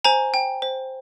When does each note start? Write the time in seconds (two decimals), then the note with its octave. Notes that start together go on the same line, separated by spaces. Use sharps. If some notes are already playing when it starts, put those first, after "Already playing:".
0.05 C5 G#5 A#5
0.34 G5
0.62 C5